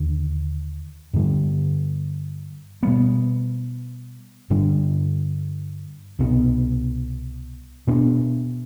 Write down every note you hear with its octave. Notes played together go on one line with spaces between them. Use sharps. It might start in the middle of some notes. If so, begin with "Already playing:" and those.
Already playing: D#2 D3
G2 D3 G3
B2 G3 B3
G2 D3 G3 D4
C2 B2 G#3 B3
B2 B3 D4